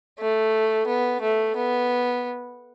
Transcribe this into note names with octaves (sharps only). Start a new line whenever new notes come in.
A3
B3
A3
B3